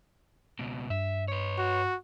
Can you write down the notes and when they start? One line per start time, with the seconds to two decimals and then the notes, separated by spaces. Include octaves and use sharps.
0.59 C#2 B2
0.90 G2 E5
1.28 B4 C#5
1.58 F#4